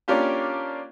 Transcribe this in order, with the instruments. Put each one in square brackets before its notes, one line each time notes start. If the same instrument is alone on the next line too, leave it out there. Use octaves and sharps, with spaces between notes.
[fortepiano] A#3 C#4 D4 F4 G4